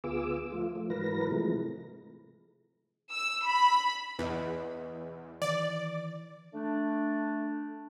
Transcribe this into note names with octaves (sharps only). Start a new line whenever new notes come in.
D2 B3 F4 G#4 D6 E6
F3 A3 F4
F3 A3
G#2 E3 F#3 A#4 B4 A#6
C3 E3 F3 G#3 A3
E6
B5
E2 B4 D#5
D#3 E3 D5
A3 D4